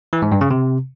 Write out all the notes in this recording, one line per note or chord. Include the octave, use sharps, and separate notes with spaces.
E3
G#2
G2
C#3
C3